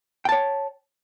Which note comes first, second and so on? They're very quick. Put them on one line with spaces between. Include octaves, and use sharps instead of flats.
G5 A5 C#5